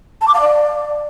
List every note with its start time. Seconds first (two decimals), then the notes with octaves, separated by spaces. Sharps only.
0.21 A5
0.28 D6
0.34 F5
0.41 D5